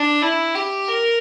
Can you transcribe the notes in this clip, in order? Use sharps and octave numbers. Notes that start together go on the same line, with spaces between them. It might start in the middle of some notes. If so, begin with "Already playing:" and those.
Already playing: D4
E4
G4
A#4